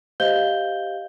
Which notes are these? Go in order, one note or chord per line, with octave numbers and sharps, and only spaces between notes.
G4 C5 D#5 F5 G6 G7